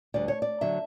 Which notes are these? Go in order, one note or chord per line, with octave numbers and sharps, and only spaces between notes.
D2 D3 G3 D5
C#5
D5
D3 F#3 E5